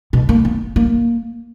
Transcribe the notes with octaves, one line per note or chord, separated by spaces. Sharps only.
B2
A#3
B3
A#3